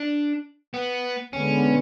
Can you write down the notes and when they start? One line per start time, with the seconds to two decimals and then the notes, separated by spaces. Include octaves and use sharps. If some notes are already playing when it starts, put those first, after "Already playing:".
Already playing: D4
0.74 B3
1.33 D3 G#3 B3 C#4